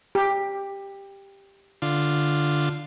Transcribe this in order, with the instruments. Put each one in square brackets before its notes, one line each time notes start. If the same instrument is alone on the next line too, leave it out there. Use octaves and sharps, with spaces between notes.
[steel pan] G4
[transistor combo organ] D3 F4